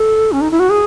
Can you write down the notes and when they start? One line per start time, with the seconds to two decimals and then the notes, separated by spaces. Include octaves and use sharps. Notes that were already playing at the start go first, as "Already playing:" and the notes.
Already playing: A4
0.32 C#4
0.41 D#4
0.51 E4
0.60 F#4
0.70 G#4